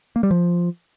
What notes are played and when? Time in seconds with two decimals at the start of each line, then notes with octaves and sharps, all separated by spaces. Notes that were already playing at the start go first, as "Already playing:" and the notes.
0.16 A#3
0.23 G3
0.31 F3